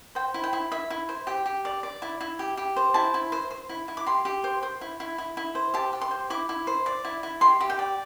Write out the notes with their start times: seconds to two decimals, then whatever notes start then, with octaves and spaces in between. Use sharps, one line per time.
0.15 C5 G5
0.34 E4
0.44 G5
0.53 E4
0.71 E4 E5
0.90 E4
1.09 C5
1.27 G4 G5
1.46 G4
1.65 D5
1.83 D5
2.02 E4
2.21 E4
2.39 G4
2.57 G4
2.76 C5
2.94 E4 A5
3.14 E4
3.32 C5
3.51 C5
3.69 E4
3.88 E4
3.97 D6
4.06 G4 C6
4.25 G4
4.44 C5
4.63 C5
4.81 E4
5.00 E4
5.18 E4
5.37 E4
5.55 C5
5.74 G4 A5
5.93 G4
6.01 C6
6.11 C5
6.30 E4 D6
6.49 E4
6.67 C5
6.86 D5
7.05 E4
7.23 E4
7.41 G4 C6
7.61 G4
7.70 G5
7.79 D5